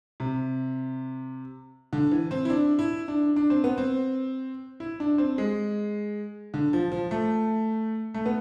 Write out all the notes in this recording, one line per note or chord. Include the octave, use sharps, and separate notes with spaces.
C3
D3
E3
C4
E4
D4
E4
D4
D4
C4
B3
C4
E4
D4
C4
G#3
D3
F3
F3
A3
A3
B3